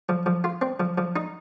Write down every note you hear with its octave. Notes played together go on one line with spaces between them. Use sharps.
F3
F3
F4
C4
F3
F3
D#4